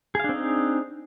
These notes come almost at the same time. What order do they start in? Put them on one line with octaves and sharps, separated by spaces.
G#4 F5 D4 C4 D#4